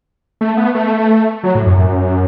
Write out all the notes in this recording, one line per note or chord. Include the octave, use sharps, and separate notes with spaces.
A3
B3
A3
F#3
A2
F#2
F#2